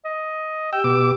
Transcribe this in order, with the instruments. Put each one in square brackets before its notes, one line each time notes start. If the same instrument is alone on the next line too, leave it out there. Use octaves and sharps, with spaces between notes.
[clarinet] D#5
[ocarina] G4 [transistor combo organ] G5 [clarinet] E6
[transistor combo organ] B2 D6